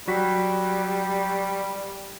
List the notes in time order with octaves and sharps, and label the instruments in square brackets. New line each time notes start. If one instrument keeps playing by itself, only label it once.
[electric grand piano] F#3 F#4 B6 [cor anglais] G3